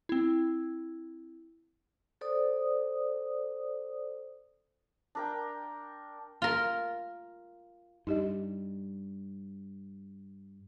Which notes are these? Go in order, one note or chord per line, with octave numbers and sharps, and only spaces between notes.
C4 E4
A4 C5 D5 D#6
D4 A#4 G5
F4 A#4
G2 D#4 G4 D#5